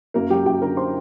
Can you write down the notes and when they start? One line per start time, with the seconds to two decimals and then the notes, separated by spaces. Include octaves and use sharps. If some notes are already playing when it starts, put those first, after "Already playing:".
0.14 F#2 A#3 A#4
0.30 F#3 G4 G5
0.46 F#2 G4 G5
0.62 D3 A#4 A#5
0.77 C5 C6